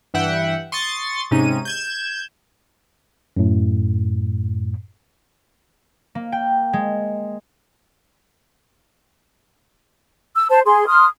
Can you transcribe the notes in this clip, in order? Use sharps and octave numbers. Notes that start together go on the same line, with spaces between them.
G2 E3 E5 F#5 G5
C6 C#6 D#6 A6
G#2 C3 C#4 D#4 D#7
G6 G#6 E7
F#2 A2
A#3
G5
G#3
E6
C5 A5
G#4 C6
C6 D#6 F6